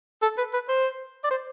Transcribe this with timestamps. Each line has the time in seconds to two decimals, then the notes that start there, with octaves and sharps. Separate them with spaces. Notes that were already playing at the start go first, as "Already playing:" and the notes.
0.22 A4
0.38 B4
0.53 B4
0.69 C5
1.24 D5
1.30 C5